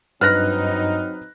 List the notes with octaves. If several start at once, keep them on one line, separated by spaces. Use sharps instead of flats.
G2 F#3 C4 D#4 B4 F6 F#6 A#6